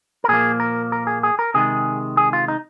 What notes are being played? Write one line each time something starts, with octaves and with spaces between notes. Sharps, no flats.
A#4
A#2 F3 A#3 G#4
A#4
A#4
G#4
G#4
A#4
C3 D#3 G#3 G#4
G#4
F4
D#4